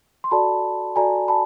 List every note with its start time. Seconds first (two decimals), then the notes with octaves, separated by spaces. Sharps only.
0.24 C6
0.31 F#4 A4 D5 A5 B5
0.96 F#4 A4 D5 G#5 A#5
1.28 A5 B5